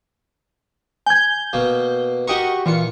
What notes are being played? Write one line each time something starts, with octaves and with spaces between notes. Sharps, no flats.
G#5 G6 G#6
B2 A#3
F#4 G4 A#4 D#5 F#5 C#6
A#2 E3 F4 C#7